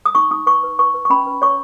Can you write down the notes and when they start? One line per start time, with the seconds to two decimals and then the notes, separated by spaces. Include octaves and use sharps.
0.06 D#6
0.15 D#4 C#6
0.31 D#4 D#6
0.46 B4 C#6
0.63 B4
0.79 B4 C#6
0.94 B4
1.05 C#6
1.10 C#4 B5
1.26 B4
1.42 C#5 C#6